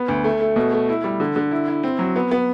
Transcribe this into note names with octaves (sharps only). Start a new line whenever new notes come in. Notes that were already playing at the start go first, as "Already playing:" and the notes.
Already playing: B3
D2
A3
A3
B2
A3
E4
G3
D3
D3
E4
E4
C4
F#3
B3
B3